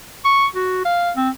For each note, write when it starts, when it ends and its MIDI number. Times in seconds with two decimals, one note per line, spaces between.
0.25 0.47 85
0.56 0.81 66
0.85 1.11 77
1.17 1.30 60